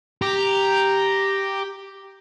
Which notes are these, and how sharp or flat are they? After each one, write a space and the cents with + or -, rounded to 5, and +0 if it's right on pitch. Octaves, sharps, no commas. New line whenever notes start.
G4 +0 A#5 +0